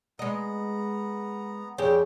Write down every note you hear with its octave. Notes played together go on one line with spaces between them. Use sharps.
G#3 B3 D#5 A#5
F2 G3 G#4 C#5 G5